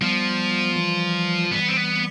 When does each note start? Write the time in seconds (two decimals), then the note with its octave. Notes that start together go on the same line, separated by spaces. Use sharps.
0.01 F3 G3 B3
0.76 E3 G3
1.52 E3 G3 B3
1.68 C4
1.77 B3